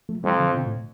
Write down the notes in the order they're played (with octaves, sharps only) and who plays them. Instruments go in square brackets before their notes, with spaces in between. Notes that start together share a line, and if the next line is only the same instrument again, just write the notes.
[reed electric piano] F3 A3
[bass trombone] F2 [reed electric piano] E3 G3
[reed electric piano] D3 F3
B2 D3
A2